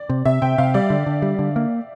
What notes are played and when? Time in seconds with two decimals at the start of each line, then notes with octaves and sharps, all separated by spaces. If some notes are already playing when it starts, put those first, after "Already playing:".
Already playing: D5
0.09 C3
0.25 C3 E5
0.42 C3 G5
0.58 C3 F5
0.74 G3 D5
0.90 D3
1.06 D3
1.22 G3
1.39 D3
1.56 A#3